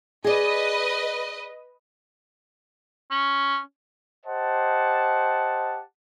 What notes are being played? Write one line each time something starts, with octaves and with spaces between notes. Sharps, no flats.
G#4 B4 D5 D#5
C#4
G4 C5 D#5 F#5 A5